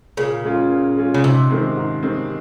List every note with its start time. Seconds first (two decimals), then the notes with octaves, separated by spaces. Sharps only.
0.17 A#2 C#3
0.44 G#3 C#4 F4
0.70 A#2
0.97 G#3 C#4 F4
1.14 C#3
1.24 G#2 C3
1.50 D#3 G#3 C4
1.77 G#2
2.03 D#3 G#3 C4